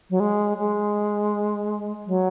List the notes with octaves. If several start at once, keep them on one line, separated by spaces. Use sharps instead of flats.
F#3
G#3
G#3
F#3